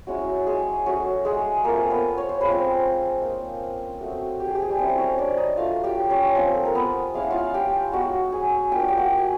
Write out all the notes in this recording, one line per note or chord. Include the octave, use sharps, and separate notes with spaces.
G#3 C#4 E4 F#4
G#3 G#4
F#3 A3 C#4 F#4
G#3 G#4
A3 A#3 C4 F4 A#4
B3 B4
C#5
C5
G#3 C#4 F4 B4
C4 C5
A#3 D#4
A3 C4 D#4 F#4
G4
G#4
G4
G#4
G3 G4
F#3 A3 C4 C#4 E4 C5
C#4 C#5
D4 D5
D#4 D#5
F#3 A3 D4 F4 F5
G4 G5
C#4 C#5
F3 A#3 C4 D#4 C5
A4
A#4
B3 B4
G#3 C#4 E4 F5
F#5
F4 F5
G4 G5
G#3 B3 D#4 F#4 F#5
G#4 G#5
A#3 D4 F4 G5
F#5
G4 G5
F#4 F#5
G#5